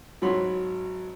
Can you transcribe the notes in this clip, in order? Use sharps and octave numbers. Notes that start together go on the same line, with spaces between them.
G#1 F#3 F#4 C#5 B5 C6